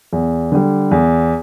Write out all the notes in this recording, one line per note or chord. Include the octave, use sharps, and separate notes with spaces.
E2
D3 G3
E2